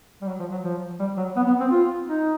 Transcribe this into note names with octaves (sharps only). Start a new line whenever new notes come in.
G3
F#3
F3
F#3
F3
G3
F#3
B3
B3
C4
F4
D#4